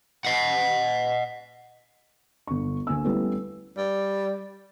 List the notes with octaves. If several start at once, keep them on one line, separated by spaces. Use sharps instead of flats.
D#5 F#5
G1 C#6
D2 A#3 G#5 E6
G3 A3 B3 C#4 E4
G3